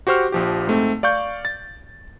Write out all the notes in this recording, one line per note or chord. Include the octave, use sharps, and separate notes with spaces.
F#4 G4 C5 C#6 F6
A#1 F3 G4
G#2 A3 C4
D5 F5 C#6 G6
A6